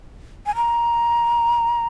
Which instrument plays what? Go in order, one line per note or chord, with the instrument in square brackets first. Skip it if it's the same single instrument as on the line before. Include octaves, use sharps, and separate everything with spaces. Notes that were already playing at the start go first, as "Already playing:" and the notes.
[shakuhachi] G#5
A#5